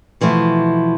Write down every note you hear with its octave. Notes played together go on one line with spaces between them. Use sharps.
B2 E3 F3 A3